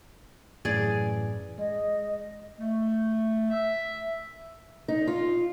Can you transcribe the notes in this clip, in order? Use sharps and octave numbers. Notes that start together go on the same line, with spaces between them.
F#2 A2 E3 G#4 D5
G#3 D#5
A3
E5
D#4
F4